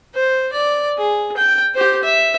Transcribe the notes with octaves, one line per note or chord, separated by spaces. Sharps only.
C5
D5
G#4
G5
G4 C5
E5